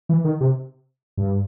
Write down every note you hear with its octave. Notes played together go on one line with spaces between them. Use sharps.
E3
D#3
C3
G2